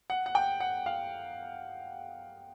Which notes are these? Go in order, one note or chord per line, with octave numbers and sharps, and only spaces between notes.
F#5
F#5
G5
F#5
F5